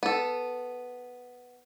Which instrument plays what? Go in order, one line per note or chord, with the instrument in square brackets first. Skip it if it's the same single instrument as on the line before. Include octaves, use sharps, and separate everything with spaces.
[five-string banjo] B3 A4